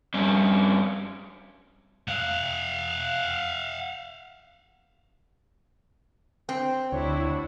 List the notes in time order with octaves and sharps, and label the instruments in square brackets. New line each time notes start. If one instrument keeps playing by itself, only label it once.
[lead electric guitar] G2 C#4
[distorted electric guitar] F5 F#5
[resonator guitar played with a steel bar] C4 [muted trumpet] C5
[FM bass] D2 [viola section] D4 E4 F#4 [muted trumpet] C#5